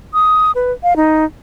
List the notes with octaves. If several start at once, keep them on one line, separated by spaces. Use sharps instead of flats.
D#6
B4
F5
D#4